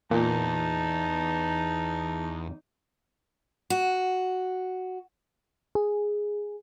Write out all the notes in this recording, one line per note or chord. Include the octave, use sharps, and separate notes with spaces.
E2 A#2 D#4 A5
F#4
G#4